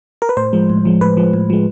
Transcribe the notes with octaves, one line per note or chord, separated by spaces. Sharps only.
A#4
B4
A2 C5
F3 G#3
A2
F3 G#3
A2 B4
F3 G#3
A2
F3 G#3